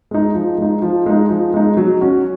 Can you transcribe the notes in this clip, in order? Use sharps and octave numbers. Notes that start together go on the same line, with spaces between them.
G#3 D#4
F3
G#3 D#4
F3
G#3 D#4
F3
G#3 D#4
F#3
C#4 F#4